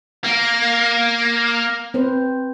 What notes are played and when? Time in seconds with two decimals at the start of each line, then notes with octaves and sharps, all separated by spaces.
0.24 A#3
1.94 C4 B4 C5